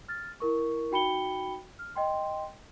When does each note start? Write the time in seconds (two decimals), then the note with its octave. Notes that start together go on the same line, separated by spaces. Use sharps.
0.08 F6 A6
0.40 E4 A#4 C#6
0.91 D#4 F#4 G5 B5 C#7 G7
1.79 F6
1.95 D#5 G5 C6